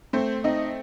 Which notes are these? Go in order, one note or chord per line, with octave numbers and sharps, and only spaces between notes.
A3 C4 C5
C4 D#4 D#5